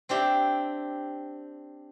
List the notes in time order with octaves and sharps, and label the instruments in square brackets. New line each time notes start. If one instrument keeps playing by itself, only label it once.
[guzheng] C4 D4 G4 E5